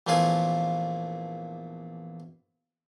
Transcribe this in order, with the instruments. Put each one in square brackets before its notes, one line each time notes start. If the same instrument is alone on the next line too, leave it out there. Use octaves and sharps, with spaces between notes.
[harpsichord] A#1 E2 A3 A#3 F4 G#5